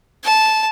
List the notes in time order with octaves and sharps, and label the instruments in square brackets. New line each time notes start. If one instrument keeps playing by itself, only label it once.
[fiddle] A5